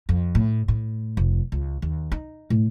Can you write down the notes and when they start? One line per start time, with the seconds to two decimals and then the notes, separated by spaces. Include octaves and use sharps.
0.09 F2
0.35 A2
0.68 A2
1.17 F1
1.52 C#2
1.82 D#2
2.12 D#4
2.50 A2